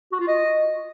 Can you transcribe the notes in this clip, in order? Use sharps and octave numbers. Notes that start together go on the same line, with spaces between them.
F#4
F4
D#5